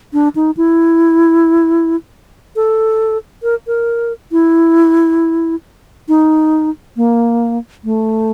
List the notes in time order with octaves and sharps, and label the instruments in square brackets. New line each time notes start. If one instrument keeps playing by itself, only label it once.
[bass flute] D4
D#4
E4
A4
A#4
A#4
E4
D#4
A#3
A3